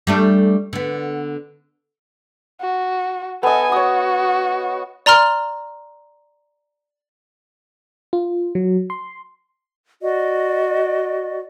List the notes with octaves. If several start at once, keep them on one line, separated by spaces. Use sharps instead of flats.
G3 A3 D4
D3 B3
F#4
B3 A4 D#5 G#5
F#4 C#5 D#6
D5 A#5 C6 F6
F4
F#3
C6
F#4 D5 D#5